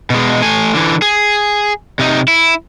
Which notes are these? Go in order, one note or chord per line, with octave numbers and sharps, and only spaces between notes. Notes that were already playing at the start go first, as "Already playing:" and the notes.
B2 G#3
A3 G#5
D3 E3
G#4
C3 D#4
E4